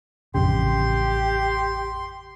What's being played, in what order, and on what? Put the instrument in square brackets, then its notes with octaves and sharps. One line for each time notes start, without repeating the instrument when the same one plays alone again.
[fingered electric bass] A1 F2 C#3 [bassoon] G4 [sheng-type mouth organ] C6